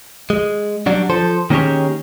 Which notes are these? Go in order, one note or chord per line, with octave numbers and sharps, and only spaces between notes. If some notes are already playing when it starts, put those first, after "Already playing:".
G#3
F#3 G3 D4 F#4
F3 A4 C5
D#3 A#3 C#4 G4 G#4 C#5